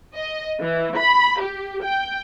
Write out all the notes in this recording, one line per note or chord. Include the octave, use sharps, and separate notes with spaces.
D#5
E3
B5
G4
G5